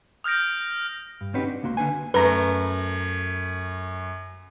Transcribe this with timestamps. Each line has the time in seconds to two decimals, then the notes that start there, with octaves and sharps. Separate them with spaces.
0.24 D#6 F6 G6 A#6 D7
1.21 G2
1.34 C4 C#4 D#4 F#4 G4 B4
1.47 D4
1.63 C#2 A#3 F#4 C6
1.77 D3 D4 B4 G#5
2.14 F#2 A3 B4 A#5